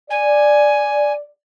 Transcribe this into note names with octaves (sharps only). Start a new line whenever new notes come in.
D5 G#5